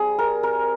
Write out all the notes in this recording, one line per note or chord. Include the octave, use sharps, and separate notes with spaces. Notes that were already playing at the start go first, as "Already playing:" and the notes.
Already playing: G3 C4 G#4
A#4
A#4